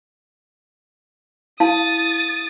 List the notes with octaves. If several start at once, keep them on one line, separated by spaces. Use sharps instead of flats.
E4 F5 A5 D#6 A6